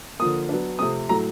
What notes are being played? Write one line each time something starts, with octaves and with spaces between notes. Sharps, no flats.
D3 F3 A#3 D#6
F#3 B3 D4
C3 F3 A3 C4 D#6
A2 F#3 A3 A#5